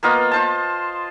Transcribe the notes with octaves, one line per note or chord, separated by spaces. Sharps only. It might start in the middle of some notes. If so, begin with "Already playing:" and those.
A#3 B3 F4 D#5
F4 C5 A5